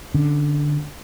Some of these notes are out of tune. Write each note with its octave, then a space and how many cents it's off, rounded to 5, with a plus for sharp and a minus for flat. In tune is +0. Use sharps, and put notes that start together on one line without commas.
D3 +0 C#4 +0